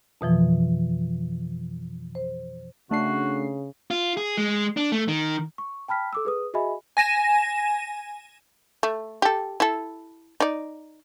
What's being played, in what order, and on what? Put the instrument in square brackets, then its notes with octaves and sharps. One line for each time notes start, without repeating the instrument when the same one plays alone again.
[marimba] F2 B2 E3 F3
C5
[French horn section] C#3 [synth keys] A3 D4 C7 [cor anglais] F#4
[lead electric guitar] F4
G#4
G#3
D4
A3
D#3
[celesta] C#6
G5 A5 B5 F6 B6
A4 D6 E6
G#4 B4 D#6
F#4 G#4 D#5 E5 G#5 B5
[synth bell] G#5 A#6 D#7 E7
[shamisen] A3
G4 A4
E4 A4
D#4 D5